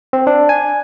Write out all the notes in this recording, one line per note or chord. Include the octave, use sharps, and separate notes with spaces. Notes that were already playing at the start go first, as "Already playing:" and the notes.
C4
D4
G#5